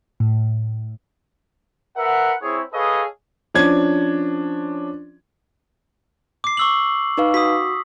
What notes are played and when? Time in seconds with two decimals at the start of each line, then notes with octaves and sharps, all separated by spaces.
0.20 A2
1.97 A#4 B4 E5 F#5
2.42 C4 E4 G#4 C#5
2.73 G#4 A4 B4 C#5 D#5 F5
3.54 F3 C#4 D4 G#6
6.44 D6 C7
6.57 C#6 E6 F#7
7.18 D#4 B4 F5
7.34 F#4 D#6 B6